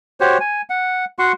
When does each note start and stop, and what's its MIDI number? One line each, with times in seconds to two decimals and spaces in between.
0.20 0.38 66
0.20 0.38 67
0.20 0.38 72
0.20 0.38 73
0.40 0.62 80
0.70 1.05 78
1.19 1.32 66
1.19 1.32 78
1.19 1.32 84
1.19 1.32 85